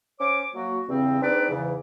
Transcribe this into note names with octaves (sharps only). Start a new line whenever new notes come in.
C#4 C5 C#5 D6
F#3 A#3 F#4
E2 G2 C#3 C4
C4 D4 D#4 G#4 B4 D5
E2 G#2 C#3 E3